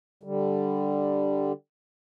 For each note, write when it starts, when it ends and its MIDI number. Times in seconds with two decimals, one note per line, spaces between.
0.23 1.53 50
0.23 1.53 55